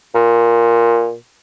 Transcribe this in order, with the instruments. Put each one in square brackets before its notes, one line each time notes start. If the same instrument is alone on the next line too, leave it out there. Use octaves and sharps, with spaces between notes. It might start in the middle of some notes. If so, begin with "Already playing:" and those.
[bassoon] A#2